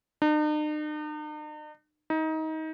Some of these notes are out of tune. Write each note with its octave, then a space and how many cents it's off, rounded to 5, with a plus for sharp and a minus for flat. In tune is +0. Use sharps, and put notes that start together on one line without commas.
D#4 -45
D#4 +25